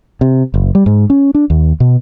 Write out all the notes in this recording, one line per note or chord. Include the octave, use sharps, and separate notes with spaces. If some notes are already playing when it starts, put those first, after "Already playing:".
C3
F#1
G3
G#2
C#4
D4
D#2
B2